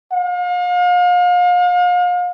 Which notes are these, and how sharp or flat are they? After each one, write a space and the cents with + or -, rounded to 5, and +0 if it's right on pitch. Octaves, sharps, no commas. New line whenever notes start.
F5 +40